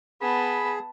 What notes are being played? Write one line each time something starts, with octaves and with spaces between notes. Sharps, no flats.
B3 G#4 A5 B5